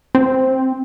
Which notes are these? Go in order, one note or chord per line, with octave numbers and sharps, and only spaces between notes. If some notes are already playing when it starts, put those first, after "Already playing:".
C4